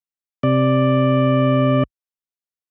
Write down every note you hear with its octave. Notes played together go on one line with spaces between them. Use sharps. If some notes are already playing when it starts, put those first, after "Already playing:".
C3 D5